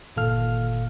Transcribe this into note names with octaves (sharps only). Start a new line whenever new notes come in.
G1 A#2 D#3 A4 F5 F6